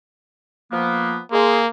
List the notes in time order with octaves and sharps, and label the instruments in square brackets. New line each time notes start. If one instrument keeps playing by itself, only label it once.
[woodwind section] F3 A#3 B3
[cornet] A#3 [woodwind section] G#4 C6